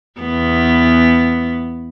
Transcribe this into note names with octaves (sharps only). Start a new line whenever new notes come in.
E2 B3